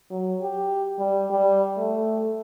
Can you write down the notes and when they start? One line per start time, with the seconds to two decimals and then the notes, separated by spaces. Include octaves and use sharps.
0.11 F#3
0.42 G4
0.99 G3
1.30 G3
1.77 A3